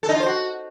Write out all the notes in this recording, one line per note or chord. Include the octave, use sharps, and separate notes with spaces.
A4
D#4
F4
C5
F#4